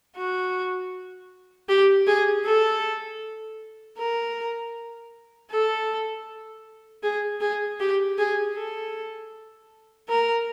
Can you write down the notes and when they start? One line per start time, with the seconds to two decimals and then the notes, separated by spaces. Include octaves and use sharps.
0.16 F#4
1.69 G4
2.07 G#4
2.45 A4
3.98 A#4
5.51 A4
7.03 G#4
7.41 G#4
7.80 G4
8.18 G#4
8.55 A4
10.08 A#4